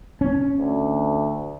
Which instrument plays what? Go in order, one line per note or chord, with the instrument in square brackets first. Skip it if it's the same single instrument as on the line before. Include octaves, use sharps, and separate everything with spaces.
[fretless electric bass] C#4
[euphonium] D2